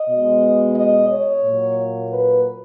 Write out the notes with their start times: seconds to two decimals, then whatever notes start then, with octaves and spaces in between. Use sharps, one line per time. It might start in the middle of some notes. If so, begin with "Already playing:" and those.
Already playing: D#5
0.09 B2 G#3 B3
0.75 D#5
1.09 C#5
1.43 A#2 F#3 A#3
2.10 B4